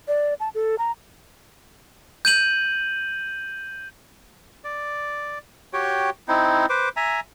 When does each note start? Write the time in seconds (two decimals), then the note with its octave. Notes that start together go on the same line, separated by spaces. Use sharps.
0.08 D5
0.40 A5
0.55 A4
0.79 A#5
2.25 G6 D#7 F#7
4.64 D5
5.73 F#4 G4 C#5 G5
6.28 C4 D#4 E4
6.70 B4 C5 D6
6.96 E5 G#5 A#5